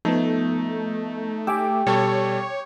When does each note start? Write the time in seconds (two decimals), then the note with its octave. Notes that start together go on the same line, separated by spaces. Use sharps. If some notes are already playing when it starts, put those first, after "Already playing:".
0.05 F3 A3 B3 D#4
1.47 G4 G#5 D6 E6
1.87 B2 G3 A4 C#5